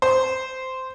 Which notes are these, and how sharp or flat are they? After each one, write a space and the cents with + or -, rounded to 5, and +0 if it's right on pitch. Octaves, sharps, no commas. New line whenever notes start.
C5 -10